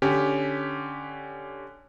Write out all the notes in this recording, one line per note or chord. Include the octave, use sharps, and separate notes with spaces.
D3 C#4 G4